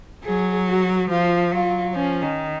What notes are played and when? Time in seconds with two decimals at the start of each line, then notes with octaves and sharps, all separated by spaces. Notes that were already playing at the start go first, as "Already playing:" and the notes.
0.25 F#3 G#4
0.68 F#4
1.10 F3 F4
1.51 F#3 F4
1.94 F3 C#4
2.22 D#3